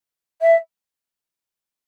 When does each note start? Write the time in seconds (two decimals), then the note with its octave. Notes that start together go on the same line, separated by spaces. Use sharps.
0.41 E5